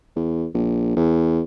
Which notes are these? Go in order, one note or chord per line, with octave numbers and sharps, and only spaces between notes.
E2
A#1
E2